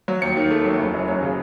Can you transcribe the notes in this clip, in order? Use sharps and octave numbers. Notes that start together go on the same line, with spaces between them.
F#3
D#2 C#7
D#3
A3
F#3
F#1
F#2
F#3
C#3